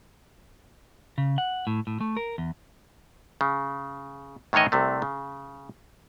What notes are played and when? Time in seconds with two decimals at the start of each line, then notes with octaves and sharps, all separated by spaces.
1.18 C#3
1.38 F#5
1.67 A2
1.87 A2
2.01 A3
2.17 A#4
2.38 E2
3.41 C#3
4.53 A2 D#3 E3 C#5 D#5
4.72 C2 C3 A3
5.02 C#3